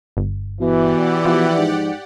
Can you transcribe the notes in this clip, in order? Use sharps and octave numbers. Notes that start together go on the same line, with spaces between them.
G1
B2 E3 G4 D5 F#5
B2 F3
G#2